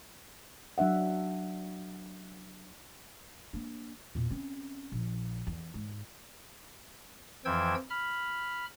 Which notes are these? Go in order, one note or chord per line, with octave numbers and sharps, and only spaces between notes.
F#3 D4 E5 F#5
A#3 D4
E2 A#2
C4 C#4
A#1
E2
G#2
F2 E3 F3 G5 E6 G#6
B5 F6